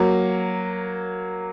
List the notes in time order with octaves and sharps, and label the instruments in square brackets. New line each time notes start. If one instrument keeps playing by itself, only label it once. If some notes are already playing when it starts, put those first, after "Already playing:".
Already playing: [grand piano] F#3 A#3